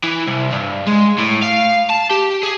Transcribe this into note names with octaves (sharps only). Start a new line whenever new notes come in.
E3
C2
G2
G#3
A2
F5
A5
G4
G#4